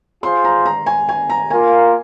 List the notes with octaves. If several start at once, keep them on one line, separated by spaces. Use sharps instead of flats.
F4 G#4 C5 C6
A#5
A#5
G#5
G#5
A#5
A#3 F4 A#4 G#5